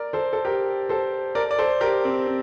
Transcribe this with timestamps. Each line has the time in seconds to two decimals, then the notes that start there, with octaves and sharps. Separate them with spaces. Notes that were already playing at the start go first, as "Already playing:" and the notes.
Already playing: A#4 D5
0.13 A4 C5
0.33 A4
0.45 G4 A#4
0.89 A4 C5
1.35 A#4 D5
1.51 D5
1.59 A4 C5
1.81 G4 A#4
2.05 C4
2.27 C4